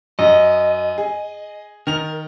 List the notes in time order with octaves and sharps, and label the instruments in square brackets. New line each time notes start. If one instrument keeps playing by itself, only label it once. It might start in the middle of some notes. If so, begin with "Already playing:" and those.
[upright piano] F#2 [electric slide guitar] D#5
[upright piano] G#4
[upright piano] D#3 F7 [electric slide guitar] A#4